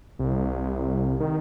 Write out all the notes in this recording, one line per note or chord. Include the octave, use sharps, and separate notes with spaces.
C2
D#3